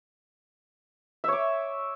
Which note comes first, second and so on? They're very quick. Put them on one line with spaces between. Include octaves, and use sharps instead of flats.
E5 C#5 D6